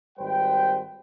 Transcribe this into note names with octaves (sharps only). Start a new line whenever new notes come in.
G#1 G3 B4 C5 G5